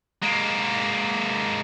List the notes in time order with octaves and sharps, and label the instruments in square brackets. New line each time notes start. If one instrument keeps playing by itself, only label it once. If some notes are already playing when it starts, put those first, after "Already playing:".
[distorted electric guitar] G#3 A#3